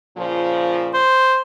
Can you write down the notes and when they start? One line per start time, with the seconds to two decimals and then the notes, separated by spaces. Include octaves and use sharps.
0.17 A#2 C#3 F3
0.93 C5